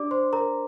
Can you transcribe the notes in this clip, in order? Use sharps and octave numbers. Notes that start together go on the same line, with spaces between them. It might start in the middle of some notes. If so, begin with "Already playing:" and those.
Already playing: D4 G4 D5 D6
C5 C6
A#4 A#5